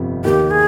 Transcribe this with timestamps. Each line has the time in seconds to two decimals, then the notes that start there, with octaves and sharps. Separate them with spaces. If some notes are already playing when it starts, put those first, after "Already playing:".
Already playing: G1 F2 C3 F3
0.25 D#2 D#3 A#3 G4
0.51 G#4